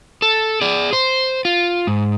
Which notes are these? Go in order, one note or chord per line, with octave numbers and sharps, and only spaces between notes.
A4
G#4 D5
C5
F4
G#2